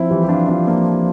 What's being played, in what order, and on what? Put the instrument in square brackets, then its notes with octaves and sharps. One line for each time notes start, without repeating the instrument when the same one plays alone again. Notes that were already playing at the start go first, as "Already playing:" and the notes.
Already playing: [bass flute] F3 [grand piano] C4 E4
[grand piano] E3 G3
G4
D4 F4
D4 F4
A#3 D4